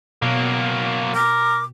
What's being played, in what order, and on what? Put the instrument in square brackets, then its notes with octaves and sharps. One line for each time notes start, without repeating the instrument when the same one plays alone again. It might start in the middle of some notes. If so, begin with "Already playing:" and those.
[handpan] B2 [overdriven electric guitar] F#3 A#3
[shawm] A#4 [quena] D6